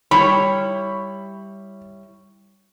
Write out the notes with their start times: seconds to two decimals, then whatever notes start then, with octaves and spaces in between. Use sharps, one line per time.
0.11 G3 E4 C#5 B5